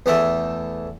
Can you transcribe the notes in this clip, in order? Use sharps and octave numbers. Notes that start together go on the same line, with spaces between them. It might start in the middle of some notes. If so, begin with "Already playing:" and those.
E2 E3 A3 B3 A4 E5